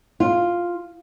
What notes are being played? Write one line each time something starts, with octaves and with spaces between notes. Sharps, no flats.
F4